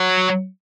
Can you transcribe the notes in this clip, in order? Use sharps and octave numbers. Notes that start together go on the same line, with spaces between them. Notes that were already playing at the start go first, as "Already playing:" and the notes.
Already playing: F#3